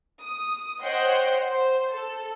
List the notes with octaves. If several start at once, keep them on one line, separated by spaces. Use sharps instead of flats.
D#6
C5 C#5 D#5 F#5 G5 C6
C5
A4